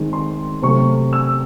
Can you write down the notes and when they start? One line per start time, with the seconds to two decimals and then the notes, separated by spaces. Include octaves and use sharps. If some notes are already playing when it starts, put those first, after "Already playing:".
Already playing: D#3 G#3 C4
0.13 C6
0.62 C3 F#3 A3 C#6
1.13 E6